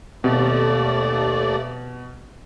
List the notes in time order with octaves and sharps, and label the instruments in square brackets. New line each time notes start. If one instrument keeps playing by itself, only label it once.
[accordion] D#2 A3 D5 [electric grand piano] B2 [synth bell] C4 G4